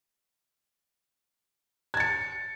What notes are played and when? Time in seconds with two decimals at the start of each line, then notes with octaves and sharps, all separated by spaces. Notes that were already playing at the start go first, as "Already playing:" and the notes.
1.94 G#6
1.97 A6
2.00 C#7